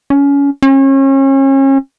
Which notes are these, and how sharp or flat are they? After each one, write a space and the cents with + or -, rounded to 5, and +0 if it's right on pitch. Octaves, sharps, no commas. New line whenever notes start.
C#4 +25
C#4 -35